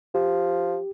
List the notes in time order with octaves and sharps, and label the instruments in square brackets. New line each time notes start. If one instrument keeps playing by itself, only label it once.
[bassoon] F3 [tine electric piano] G4